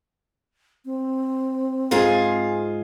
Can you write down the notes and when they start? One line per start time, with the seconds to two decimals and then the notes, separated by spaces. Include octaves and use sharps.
0.85 C4
1.91 G#2 F4 G#4